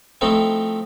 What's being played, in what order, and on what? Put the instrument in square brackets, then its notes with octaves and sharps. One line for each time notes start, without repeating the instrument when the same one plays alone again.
[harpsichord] F3 A3 C4 D#4 E4